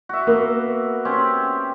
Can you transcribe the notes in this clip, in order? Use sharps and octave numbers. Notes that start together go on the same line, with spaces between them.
F#4 E5
A#3 B3
C4 C#4 G4